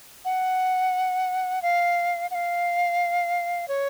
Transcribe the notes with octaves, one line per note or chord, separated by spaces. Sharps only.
F#5
F5
F#5
F5
C#5